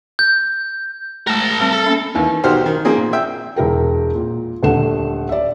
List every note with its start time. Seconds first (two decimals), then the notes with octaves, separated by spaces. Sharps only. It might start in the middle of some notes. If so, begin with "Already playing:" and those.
0.19 G6
1.27 G#3 A3 A#4 A5
1.60 G3 C4
1.72 A4
1.84 A#3 C#4 E5
2.15 D#2 E3
2.44 B1 D#3 F#4 G4 C5 F6
2.66 D#3
2.85 F3 A#3 C4 G#4
2.98 A#2
3.13 E5 G5
3.56 E1 E4 A#4 G5
4.15 A#2
4.63 D#1 D3 A3 F#5 E7
5.29 D5 E5